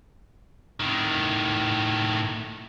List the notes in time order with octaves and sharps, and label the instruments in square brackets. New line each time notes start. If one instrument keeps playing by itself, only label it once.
[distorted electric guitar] A2 D#3